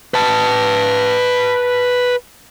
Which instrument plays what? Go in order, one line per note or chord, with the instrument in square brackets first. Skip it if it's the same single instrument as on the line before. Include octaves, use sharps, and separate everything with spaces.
[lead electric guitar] B4 A5